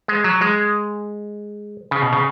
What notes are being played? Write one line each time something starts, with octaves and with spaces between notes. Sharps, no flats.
G#3
F#3
G#3
C#3
B2
C#3